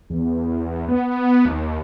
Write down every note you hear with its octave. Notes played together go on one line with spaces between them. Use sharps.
E2
B3
D#2